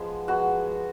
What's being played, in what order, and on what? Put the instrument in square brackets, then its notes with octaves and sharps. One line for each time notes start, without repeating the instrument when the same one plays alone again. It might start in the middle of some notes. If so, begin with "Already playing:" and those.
Already playing: [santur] F3 G#3 B3 G#4
F3 G#3 B3 F#4